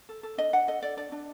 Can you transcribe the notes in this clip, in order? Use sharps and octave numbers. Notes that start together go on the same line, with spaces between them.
A4
A4
D4 D#5
D4 F#5
A4 D#5
A4 D5
D4 D5
D4